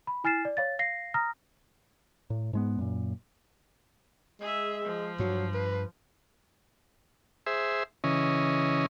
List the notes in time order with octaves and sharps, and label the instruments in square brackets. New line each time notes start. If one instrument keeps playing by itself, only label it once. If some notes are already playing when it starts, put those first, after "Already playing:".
[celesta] B5
E4 G#5 F6 A6 C7 E7
D5
C#5 F5 A6
F5 A#6 C7
A#5 D#6 F6 A#6
[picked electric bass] A2
G#2 G#3 B3
F#2 A#2
[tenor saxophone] G#3 [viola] G#4 E5
[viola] F3
[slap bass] G2 [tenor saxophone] F#3
[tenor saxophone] B4
[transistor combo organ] G#4 C5 E5
C#3 E3 C#4 D#5